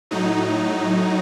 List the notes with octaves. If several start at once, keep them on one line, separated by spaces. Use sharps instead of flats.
A2 F#3 D#4